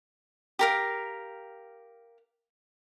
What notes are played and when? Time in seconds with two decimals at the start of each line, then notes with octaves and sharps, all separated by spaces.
0.59 G4 A#4 F5